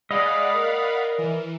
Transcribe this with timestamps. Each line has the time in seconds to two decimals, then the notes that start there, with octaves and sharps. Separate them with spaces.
0.11 G#3 D5 D#5 F5 F#5 B5
0.55 A#4
1.18 E3